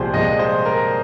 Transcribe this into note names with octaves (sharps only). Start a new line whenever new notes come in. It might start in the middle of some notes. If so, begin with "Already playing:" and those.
Already playing: C2 A#2 F3 G#3 G4 G#4 C5
C2 A#2 F3 G#3 D#5
C5
A#4